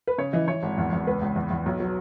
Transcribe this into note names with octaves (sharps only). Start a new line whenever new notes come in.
B4
C#3 C#5
E3 D#5
E3 C#5
G#1
E2
E2
C#2 B4
C#2
E2
E2
B1
F#3